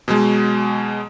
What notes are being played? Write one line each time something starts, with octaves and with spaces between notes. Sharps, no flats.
B2 F#3 G#3